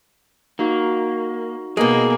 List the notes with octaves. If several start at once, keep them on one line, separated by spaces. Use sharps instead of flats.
A#3 D#4 F#4
B2 G#3 A#3 G#4